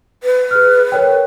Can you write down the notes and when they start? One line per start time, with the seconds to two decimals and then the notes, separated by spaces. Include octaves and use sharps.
0.23 B4
0.51 G#4 F6
0.92 A#4 C#5 G5